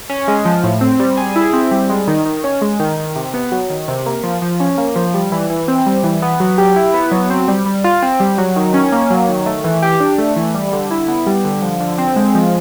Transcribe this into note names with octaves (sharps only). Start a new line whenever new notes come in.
C#4
G#3
F3
A2
C4
G3
G#4
E4
C4
G3
G#3
D#3
D#3
C#4
G#3
D#3
D#3
C3
B3
F#3
D#3
C3
A#3
F3
F3
C#4
A#3
F3
G3
E3
E3
C4
G3
E3
B3
F#3
G4
E4
B3
F#3
C4
G3
G3
F4
C4
G3
F#3
D#3
C#4
A#3
F#3
D#3
A3
E3
G4
D4
A3
E3
G3
D3
E4
B3
G3
D3
F3
D3
C4
G#3
F3